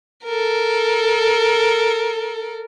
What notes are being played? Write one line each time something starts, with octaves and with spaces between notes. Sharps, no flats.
A4 A#4